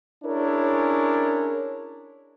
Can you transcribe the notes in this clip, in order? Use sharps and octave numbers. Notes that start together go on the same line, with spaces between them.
C#4 D4 E4 G#4 A#4 C#5